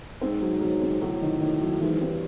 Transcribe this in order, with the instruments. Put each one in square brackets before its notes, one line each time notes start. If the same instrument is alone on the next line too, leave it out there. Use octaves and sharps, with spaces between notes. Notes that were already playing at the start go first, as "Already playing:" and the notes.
[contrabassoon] G#2 [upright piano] C4
[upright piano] F#3
F#3
C4
[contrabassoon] A2 [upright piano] F#3
[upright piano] D#3
D#3
F#3
[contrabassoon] G#2 [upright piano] E3
[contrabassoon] G2 [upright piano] C4